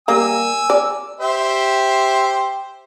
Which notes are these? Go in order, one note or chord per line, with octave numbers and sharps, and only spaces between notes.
G3 A#3 G#5 E6
D5
G4 C5 E5